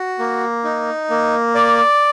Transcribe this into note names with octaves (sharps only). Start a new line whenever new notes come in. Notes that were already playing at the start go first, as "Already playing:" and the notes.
Already playing: F#4
A#3
D#4
A#3
D5